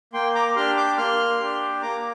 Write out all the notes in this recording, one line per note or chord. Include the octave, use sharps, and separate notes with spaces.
A#3 G5 C6
A#5 D6
D4 G4 C6 F6
D6 G6
A#3 C6 F6
D4 G4
A#3 A#5 D6